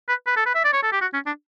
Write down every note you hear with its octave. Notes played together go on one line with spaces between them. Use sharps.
B4
B4
A4
B4
E5
D5
C#5
A4
G4
F#4
C#4
D4